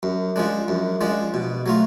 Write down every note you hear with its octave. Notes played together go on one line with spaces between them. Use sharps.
F#2
F3 G#3 D4
F#2
F3 G#3 D4
B2
F#3 A3 F4